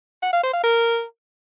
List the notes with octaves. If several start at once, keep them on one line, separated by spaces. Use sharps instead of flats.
F#5
F5
C5
F5
A#4